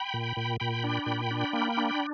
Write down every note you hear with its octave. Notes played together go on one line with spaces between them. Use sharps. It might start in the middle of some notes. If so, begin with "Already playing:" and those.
Already playing: G5 B5
A#2
A#2
A#2 G5 B5
D4
A#2
D4
A#3
D4